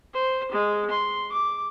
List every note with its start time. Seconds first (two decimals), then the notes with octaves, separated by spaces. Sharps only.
0.14 C5
0.52 G#3
0.91 C6
1.32 D6